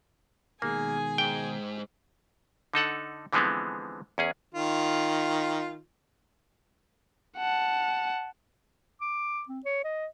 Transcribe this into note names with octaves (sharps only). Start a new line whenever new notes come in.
B2 D#3 G#3 A#3 G#4 G#5
G#2 G5
D3 D#4 A4 F#5
D3 E3 F3 G#3 B3 C4
E2 C#4 G#4
D#3 F4
F#5 A5
D6
C4
C#5
D#5